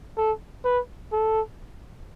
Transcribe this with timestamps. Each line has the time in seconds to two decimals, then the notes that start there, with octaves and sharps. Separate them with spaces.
0.18 A4
0.65 B4
1.13 A4